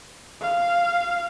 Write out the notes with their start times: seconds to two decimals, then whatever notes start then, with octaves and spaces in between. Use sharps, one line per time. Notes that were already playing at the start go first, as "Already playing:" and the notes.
0.41 F5